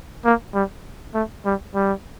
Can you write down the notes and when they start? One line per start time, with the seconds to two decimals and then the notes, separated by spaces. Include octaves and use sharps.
0.25 A#3
0.55 G3
1.14 A3
1.45 G3
1.75 G3